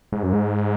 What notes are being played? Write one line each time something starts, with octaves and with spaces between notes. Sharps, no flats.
G#2
F#2
G#2